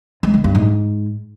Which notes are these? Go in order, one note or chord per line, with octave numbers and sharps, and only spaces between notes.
G#3
D3
G2
G#2